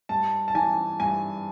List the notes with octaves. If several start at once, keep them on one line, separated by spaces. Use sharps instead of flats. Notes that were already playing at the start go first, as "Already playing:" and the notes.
G2 A5
A5
E3 G#5
G2 G#5